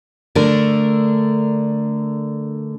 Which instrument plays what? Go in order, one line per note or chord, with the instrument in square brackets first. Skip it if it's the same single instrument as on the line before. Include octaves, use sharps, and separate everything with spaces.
[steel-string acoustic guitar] D3 A3 D4 A#4